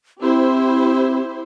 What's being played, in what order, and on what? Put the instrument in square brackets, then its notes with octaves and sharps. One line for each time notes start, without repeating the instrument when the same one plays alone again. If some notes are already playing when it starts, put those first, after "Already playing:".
[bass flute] C4 [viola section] E4 G4 C5